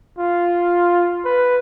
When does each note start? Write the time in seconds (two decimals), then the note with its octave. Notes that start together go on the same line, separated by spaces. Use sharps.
0.18 F4
1.25 B4